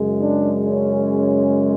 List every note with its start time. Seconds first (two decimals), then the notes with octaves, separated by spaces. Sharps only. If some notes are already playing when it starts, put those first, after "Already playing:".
Already playing: F#2 C#3 G#3
0.20 D4
0.65 C#4